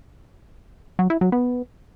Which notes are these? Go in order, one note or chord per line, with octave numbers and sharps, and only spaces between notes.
F#3
E4
F#3
B3